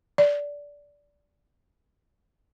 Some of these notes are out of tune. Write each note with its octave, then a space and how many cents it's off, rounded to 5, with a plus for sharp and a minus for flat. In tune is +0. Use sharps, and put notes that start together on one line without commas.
D5 -15